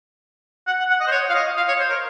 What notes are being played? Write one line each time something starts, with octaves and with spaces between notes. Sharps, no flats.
F#5
F#5
F#5
D#5
C5
C#5
F5
D#5
F5
C#5
C5
A#4